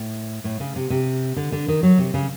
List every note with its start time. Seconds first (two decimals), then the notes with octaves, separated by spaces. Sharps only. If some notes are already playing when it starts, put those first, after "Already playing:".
Already playing: A2
0.44 A2
0.60 C#3
0.76 C3
0.90 C3
1.36 D3
1.52 D3
1.68 D#3
1.83 F#3
1.98 C3
2.14 C#3